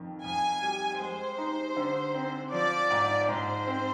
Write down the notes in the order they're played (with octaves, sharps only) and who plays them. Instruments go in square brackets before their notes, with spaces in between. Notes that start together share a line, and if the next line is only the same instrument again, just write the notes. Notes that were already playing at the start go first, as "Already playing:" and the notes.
Already playing: [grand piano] F2 D#3
[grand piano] F2 [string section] G#5
[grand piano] G3
[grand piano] G#3 [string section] C5
[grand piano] D#4
D3
C4
[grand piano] F3 [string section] D5
[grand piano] G#2
[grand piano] G#2 [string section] C5
[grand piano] C4